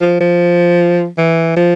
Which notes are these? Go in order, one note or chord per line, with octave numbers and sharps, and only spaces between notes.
F3
F3
E3
F3